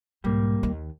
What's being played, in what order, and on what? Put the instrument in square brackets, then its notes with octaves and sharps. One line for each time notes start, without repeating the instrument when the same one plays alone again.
[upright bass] B1 G#2 [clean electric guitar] G3 A#3
[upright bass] D#2 D#3